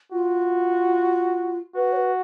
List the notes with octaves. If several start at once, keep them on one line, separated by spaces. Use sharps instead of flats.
F4 F#4
F#4 B4
C#5
B4